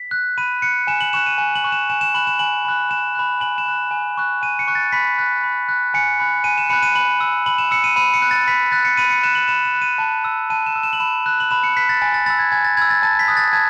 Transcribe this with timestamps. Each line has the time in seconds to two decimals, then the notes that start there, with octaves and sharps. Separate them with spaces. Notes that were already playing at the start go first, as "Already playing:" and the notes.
Already playing: B6
0.11 F#6
0.38 B5 D#7
0.62 F#6 C#7
0.87 G#5 E7
1.01 F#7
1.13 C#6 F#6 E7
1.26 D#7
1.38 G#5
1.55 F#7
1.64 C#6 F#6
1.72 E7
1.90 G#5 E7
2.01 E7
2.14 B5 F#6 F#7
2.27 E7
2.39 G#5 F#7
2.65 B5 F#6
2.90 G#5 E7
3.15 B5 F#6
3.40 G#5 F#7
3.58 E7
3.66 B5 F#6
3.91 G#5
4.17 C#6 F#6
4.42 G#5 D#7
4.59 C#7
4.68 C#6 F#6
4.75 A6
4.92 B5 B6
5.18 F#6
5.44 B5
5.69 F#6
5.94 G#5 C#7
6.20 B5 F#6
6.44 G#5 D#7
6.58 E7
6.69 B5 F#6 C#7
6.83 D#7
6.95 B5 F#7
7.20 E6
7.46 B5 F#7
7.58 E7
7.71 E6 C#7
7.84 D#7
7.96 B5 D#7
8.14 C#7
8.22 F#6
8.31 A6
8.48 B5 B6
8.72 F#6 A6
8.85 C#7
8.97 B5 D#7
9.10 C#7
9.23 F#6 E7
9.35 F#7
9.48 B5 E7
9.65 E7
9.74 F#6
9.82 D#7
9.98 A5
10.24 E6
10.50 A5 D#7
10.66 E7
10.76 E6
10.83 E7
10.93 F#7
11.00 B5 E7
11.26 F#6
11.40 F#7
11.51 B5 E7
11.63 C#7
11.77 F#6 B6
11.89 A6
12.02 G#5 A6
12.14 A6
12.26 B5 E6 A6
12.39 G#6
12.52 G#5 G#6
12.64 A6
12.77 B5 E6 G#6
12.90 A6
13.02 A5 A6
13.19 B6
13.28 D#6 F#6
13.37 A6
13.53 A5 G#6